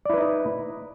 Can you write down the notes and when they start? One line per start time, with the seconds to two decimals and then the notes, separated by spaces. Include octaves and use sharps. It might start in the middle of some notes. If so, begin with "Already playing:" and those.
0.05 D5
0.10 E4
0.14 B4
0.18 D#4
0.22 D#5